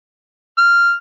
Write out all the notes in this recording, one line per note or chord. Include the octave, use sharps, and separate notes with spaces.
F6